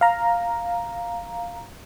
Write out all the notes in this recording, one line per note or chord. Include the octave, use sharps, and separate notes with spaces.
F5 A#5